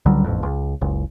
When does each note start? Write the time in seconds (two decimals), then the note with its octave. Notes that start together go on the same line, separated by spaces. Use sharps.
0.06 C#2 D3 F#3 G3
0.24 D#1 A1 F2
0.43 C#2
0.81 F#1 C#2